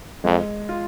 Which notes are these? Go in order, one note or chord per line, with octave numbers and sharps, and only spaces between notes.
F2 G#3
F4